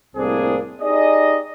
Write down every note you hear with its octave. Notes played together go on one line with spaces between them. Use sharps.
C2 A2 A#3 C4 D4 G#4
D#4 G4 G#4 D5 D#5